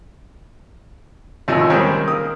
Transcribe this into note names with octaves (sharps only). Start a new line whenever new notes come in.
A1 D#2 C3 F3 D#5
D#3 G3 G#3 C4 C#4 D#4
A#3 D#6